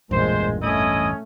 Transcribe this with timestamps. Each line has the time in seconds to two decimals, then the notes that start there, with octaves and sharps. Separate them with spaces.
0.11 A1 E2 G2 A#2 G#3 C5
0.62 A3 C#4 E4 D#5 D#6